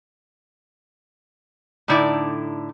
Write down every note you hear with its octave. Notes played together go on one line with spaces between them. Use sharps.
A2 D3 D#4 E4 D5